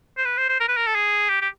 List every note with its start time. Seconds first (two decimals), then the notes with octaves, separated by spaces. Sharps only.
0.18 C5
0.25 B4
0.37 C5
0.49 C5
0.60 A#4
0.68 B4
0.77 A#4
0.87 A4
0.95 G#4
1.29 G4
1.42 G4